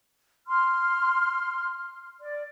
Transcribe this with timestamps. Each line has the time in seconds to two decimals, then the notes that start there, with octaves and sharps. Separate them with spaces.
0.48 C6 F6
2.20 D5